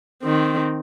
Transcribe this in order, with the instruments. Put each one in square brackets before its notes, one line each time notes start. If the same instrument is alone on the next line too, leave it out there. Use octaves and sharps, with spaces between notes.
[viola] D#3 C4